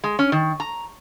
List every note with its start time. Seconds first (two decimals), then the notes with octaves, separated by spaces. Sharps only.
0.04 G#3
0.19 C#4
0.32 D#3
0.60 A#5